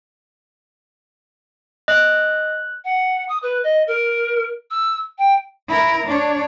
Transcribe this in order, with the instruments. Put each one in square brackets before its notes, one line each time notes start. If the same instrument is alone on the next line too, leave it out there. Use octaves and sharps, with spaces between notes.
[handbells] D#5 [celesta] F#6 F#7
[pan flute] F#5
D#6
B4
D#5
A#4
E6
G5
[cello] E4 A#4
D4 C#5